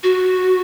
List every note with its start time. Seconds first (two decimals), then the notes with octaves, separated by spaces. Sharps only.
0.03 F#4